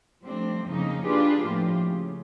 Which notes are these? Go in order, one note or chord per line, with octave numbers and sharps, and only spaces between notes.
F3 G3 A3 C4 D4
F2 C#3 F#3 A#3 D#4
D4 F4 G4 G#4 B4
A2 F3 A#3 F4 G4
C#3